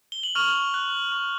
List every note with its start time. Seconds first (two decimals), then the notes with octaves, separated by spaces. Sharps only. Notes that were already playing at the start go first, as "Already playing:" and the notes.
0.12 G7
0.23 F#7
0.35 C#6 F6 F7
0.74 F#6
1.12 C#6